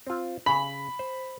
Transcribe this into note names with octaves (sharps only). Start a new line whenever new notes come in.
C4 F4
C#3 B5
C5